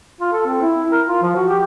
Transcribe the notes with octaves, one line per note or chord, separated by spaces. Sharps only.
F4
A4
C4
E4
A#4
F4
F3
F#4
G4